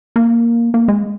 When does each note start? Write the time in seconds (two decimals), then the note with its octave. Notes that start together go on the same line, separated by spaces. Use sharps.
0.16 A#3
0.74 A#3
0.88 G#3